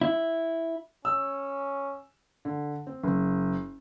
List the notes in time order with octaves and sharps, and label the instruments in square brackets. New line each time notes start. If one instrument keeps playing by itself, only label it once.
[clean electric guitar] E4
[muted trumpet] C#4 [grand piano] E6
[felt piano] D3
C4
F#1